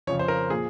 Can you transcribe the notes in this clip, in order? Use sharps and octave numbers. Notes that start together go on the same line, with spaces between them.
F2 C#3 F3 C#5
C5
A#4
A#2 F3 G#4